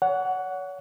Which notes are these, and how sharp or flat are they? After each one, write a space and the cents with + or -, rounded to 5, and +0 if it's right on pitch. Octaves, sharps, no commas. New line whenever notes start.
C#5 +35 F#5 +0